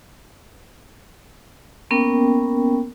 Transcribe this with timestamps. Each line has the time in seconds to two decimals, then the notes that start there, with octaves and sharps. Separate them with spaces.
1.91 A#3 B3 C#4 A#4 G5